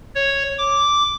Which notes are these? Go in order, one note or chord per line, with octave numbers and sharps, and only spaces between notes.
C#5
D6